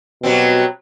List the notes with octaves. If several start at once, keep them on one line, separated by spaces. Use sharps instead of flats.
B2 F#3 G3 C4